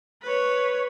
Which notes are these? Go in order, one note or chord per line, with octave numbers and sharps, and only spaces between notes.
B4 C#5